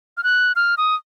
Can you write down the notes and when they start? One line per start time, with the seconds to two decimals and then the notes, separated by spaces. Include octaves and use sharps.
0.17 F6
0.24 F#6
0.56 F6
0.78 D#6